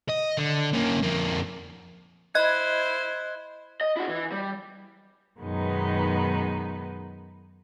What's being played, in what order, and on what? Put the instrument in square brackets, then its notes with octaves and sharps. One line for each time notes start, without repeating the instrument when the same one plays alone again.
[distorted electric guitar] D#5
D3
A#3 C#4
F2 A#3
[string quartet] E4 C5 [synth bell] D#5 F#6 G#6
[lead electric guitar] D#5
E4 F#4
E3
G3
[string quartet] F#2 B2 D#3 G#3 B3 D#4